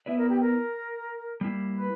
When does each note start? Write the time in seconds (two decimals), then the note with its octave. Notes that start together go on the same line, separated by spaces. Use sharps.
0.06 B3 E4 B4 D5 E5
0.18 A#4
0.29 G4
0.41 A#4
1.41 G3 A#3 E4
1.75 B4